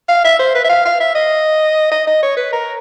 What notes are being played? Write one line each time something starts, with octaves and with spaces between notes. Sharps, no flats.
F5
E5
C5
B4
E5
F5
F5
E5
D#5
D#5
D#5
C#5
B4
A#4